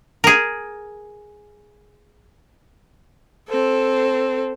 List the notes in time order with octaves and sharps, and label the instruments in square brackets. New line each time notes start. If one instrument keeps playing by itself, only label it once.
[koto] G#4 A#4
[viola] C4 A4